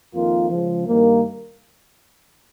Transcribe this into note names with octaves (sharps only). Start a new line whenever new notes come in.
F2 D#3 A#3 F4
C#2 C#3 F3
G2 D#3 A#3